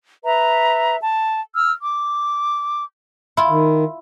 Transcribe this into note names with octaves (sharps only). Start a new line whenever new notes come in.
B4 E5 A#5
A5
E6 F6
D6
E4 F4
D#3